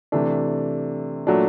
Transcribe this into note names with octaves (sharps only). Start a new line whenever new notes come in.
C3 E3 A3 D4
A#2 F#3 A3 D4